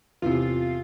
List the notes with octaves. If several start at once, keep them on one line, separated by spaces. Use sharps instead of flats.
E2 A2 C3 F4